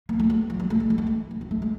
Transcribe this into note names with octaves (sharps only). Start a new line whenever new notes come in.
A#3
A3
G3
F3
G3
A3
G#3
G#3
A3
G#3
A3
A#3
A3
G#3